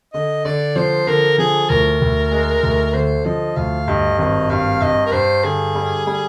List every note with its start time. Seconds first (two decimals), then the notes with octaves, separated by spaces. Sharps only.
0.13 D3 D#5
0.45 D3 D5
0.76 F3 C5
1.07 D3 A#4
1.38 F3 G#4
1.69 D2 A#4
2.01 D2
2.31 G#3
2.63 D2
2.94 D3 C5
3.25 F3 D#5
3.56 D2 F5
3.88 G2 D#5
4.18 G#1 D#5
4.50 G2 F5
4.82 G2 D#5
5.06 A#4
5.12 G2 C5
5.44 D3 G#4
5.75 G3
6.06 G3